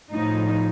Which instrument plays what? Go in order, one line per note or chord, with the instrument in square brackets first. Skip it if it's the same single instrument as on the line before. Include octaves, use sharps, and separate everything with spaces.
[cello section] A2 F3 D#4